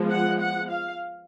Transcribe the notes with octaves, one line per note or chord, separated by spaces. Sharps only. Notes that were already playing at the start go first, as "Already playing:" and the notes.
Already playing: F3 G#3 B3
F#5
F#5
F5